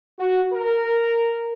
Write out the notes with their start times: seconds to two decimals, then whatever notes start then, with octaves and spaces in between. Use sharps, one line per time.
0.19 F#4
0.53 A#4